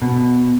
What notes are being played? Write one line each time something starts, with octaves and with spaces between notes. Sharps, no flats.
B2